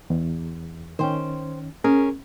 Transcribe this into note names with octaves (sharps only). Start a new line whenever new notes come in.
E2
D#3 C#4 C5 G5
C#4 G#4 A#4